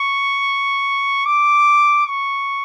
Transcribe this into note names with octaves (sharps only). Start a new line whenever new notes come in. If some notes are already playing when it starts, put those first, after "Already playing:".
Already playing: C#6
D6
C#6